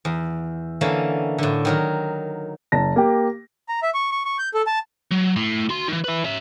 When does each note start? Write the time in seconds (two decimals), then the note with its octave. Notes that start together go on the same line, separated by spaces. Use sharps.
0.05 E2
0.81 D3 E3 A#3 C#4 A5
1.38 A2 D3
1.65 D#3 F#3 A#4
2.72 F#1 A5 A#6
2.96 A#3 G4
3.69 A#5
3.83 E5
3.94 C#6
4.12 C#6
4.25 C#6
4.39 G6
4.54 A4
4.67 A5
5.11 F#3
5.36 A2
5.69 F#4 C6
5.88 D#3 E3
6.04 E4 B4
6.24 C#4 E5